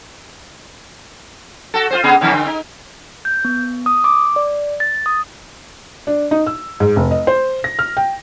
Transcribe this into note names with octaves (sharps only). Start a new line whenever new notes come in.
F#4 A4
F4 G#4 C5
C#3 B3 G#4
F#2 B2 D#3
D3
D#4
G6
B3
D#6
D6
D5
A6
D#6
D4
D#4
E6
G#2
F1
D#5
C5
A#6
F6
G5